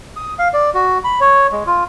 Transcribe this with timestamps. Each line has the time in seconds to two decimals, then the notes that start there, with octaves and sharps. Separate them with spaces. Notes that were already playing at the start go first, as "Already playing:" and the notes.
0.17 D#6
0.39 F5
0.54 D5
0.74 F#4
1.04 B5
1.21 C#5
1.52 G#3
1.67 F4